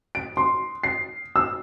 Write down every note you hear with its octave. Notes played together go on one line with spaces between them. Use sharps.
D7
C6
C7
E6